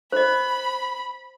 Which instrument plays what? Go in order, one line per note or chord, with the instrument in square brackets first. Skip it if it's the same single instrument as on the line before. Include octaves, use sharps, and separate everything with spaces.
[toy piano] C5 D#5 [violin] B5